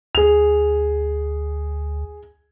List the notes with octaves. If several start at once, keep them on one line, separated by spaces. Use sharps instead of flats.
D2 G#4 F7